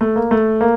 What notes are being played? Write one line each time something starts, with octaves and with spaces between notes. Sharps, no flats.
A3
A#3
A3
A#3